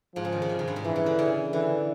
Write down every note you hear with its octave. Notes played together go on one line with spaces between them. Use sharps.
G#2 F3
C#3
D#3
C#3
C3
G#2
G2
G#2
A#2 E3
C#3
D3
C#3
D3 E3